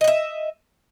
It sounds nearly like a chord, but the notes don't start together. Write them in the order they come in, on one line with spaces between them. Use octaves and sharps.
D#5 F#5 E5